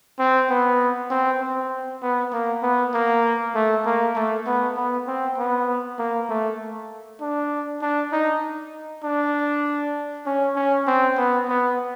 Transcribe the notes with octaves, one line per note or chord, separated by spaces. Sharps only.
C4
B3
C4
C4
B3
A#3
B3
A#3
A3
A#3
A3
B3
B3
C4
B3
A#3
A3
D4
D4
D#4
D4
C#4
C#4
C4
B3
B3